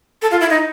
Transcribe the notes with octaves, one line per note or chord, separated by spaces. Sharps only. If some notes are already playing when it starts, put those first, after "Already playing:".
A4
F4
E4
D#4